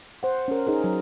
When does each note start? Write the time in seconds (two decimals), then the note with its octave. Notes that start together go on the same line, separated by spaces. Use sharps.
0.23 C5 F#5
0.48 C#4 A#4
0.67 D#4 G#4 A#4
0.84 F#3